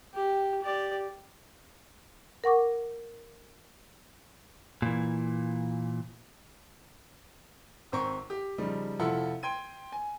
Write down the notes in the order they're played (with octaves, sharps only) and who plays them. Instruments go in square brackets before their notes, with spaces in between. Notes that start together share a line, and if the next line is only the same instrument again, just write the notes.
[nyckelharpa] G4
G4 D5
[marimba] A#4 F#5 C#6 D6
[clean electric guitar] A#2 E3
[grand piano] G#1 C4 A#5 C#6
G4
C#3 F3 G3 D#4
F1 F3 E4 F4 A4 F#5
G5 C6 G#6 D#7
G#5